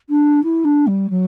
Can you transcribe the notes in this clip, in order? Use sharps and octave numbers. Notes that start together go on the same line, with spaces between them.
D4
E4
D4
G3
F#3